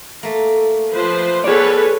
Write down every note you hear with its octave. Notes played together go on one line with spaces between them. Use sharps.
A3 A#3
F3 B4 C5
G#4 A4 B4 C#5 D5